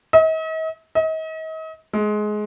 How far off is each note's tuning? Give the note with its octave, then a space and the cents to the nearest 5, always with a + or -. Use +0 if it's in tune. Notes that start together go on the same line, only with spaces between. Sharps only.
D#5 +45
D#5 +40
G#3 +20